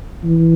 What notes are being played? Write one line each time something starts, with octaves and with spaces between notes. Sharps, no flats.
E3